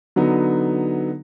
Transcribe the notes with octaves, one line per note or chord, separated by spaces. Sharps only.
D3 F#3 B3 D#4